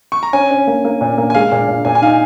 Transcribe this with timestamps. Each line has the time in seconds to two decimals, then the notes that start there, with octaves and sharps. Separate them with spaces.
0.12 C#6
0.23 A#5
0.33 C#4 G#5
0.51 C#4
0.67 A#3
0.85 A#3
1.01 A#2
1.18 A#3
1.30 G#5
1.35 G#3 F5
1.52 A#2
1.68 A#2
1.85 A#2 G#5
1.95 G#5
2.02 D#4 F5